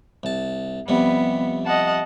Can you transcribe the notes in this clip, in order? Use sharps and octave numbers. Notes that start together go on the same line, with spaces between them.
C2 A5
F2 C3 G3 B3
D#5 F#5 A5